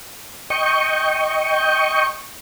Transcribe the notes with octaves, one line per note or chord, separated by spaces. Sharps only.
D#5 G5 C#6